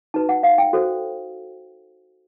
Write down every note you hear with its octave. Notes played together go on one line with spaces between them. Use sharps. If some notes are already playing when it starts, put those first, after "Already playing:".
D#4 F#4 B4 A5
F#5
F5
G5
F#4 A4 C5